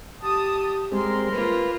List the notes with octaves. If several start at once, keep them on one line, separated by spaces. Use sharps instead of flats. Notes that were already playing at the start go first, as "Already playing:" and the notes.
G4 A5 D#6
G3 G#3 C4 A#4 C6
A#3 F4 B4